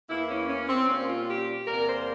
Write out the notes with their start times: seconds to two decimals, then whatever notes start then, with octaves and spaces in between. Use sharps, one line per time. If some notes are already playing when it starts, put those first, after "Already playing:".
0.10 E2 E3 A#3 E4
0.30 C#4
0.49 C#4
0.69 C4
0.89 A#2 G3 A#3 C#4
1.08 F4
1.28 G4
1.67 E2 C3 G3 A#3 A#4
1.88 C5